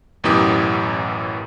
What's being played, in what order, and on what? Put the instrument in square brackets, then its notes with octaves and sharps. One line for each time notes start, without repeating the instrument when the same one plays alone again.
[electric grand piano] A1 F#2 B2 E3 G4 D#6